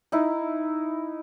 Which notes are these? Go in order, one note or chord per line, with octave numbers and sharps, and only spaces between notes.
D#4 E4